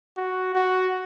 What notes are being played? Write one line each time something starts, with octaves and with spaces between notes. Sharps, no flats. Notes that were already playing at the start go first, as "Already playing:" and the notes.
F#4
F#4